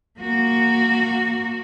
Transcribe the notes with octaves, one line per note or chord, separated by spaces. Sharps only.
A#3 F#4